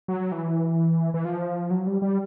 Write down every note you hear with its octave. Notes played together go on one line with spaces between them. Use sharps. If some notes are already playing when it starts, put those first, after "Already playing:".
F#3
E3
E3
F3
F#3
G3
G3